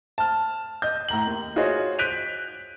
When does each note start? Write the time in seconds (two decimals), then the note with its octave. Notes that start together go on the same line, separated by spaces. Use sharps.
0.18 A5 F6
0.82 D#5 G6
1.09 A2 A#5 F#7
1.27 D#2
1.56 F4 F#4 G#4 C#5 D#5
1.99 F#6 G6 B6 D7 D#7 F7